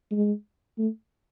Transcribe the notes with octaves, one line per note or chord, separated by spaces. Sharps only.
G#3
A3